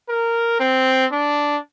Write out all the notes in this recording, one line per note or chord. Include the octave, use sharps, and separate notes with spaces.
A#4
C4
D4